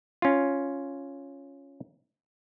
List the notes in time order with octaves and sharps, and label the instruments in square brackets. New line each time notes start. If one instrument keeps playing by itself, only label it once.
[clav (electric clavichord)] C#4 F4